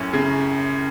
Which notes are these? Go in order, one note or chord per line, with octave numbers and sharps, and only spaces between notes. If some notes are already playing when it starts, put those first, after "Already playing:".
Already playing: F#2 A2 C#4
C#3